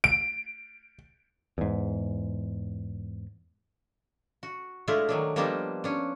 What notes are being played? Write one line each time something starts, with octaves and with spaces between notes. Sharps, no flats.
D7
E2 G#2
F#4
G#3 A3 D4 E4 F4
D#3 F#3 D4
F3 G3 A#3 B3 D4 D#4
C#4 D4